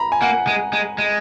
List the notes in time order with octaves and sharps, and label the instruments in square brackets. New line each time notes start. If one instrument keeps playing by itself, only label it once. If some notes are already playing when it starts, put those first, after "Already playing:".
Already playing: [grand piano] A#5 B5
G#5
[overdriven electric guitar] A#3 [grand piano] F#5
[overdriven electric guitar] G#3
G#3
G#3